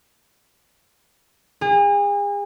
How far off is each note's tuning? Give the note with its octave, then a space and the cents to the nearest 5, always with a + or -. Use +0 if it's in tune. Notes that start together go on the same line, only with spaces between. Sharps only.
G#4 -40